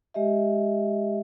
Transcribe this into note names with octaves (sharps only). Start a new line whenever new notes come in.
G#3 G4 D#5 E5